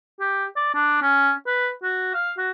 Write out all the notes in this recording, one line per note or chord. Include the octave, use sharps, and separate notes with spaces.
G4
D5
D4
C#4
B4
F#4
F5
F#4